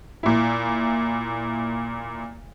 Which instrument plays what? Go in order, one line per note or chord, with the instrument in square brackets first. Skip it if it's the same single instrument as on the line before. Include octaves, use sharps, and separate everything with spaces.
[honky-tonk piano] A#2 E4